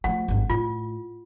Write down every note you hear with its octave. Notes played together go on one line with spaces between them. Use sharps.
F3 A3 F#5
G#1 G2
A2 F4